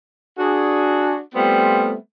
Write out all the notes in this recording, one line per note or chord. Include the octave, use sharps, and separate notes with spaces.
D4 F#4 G#4
G3 A3 B3 C4 F4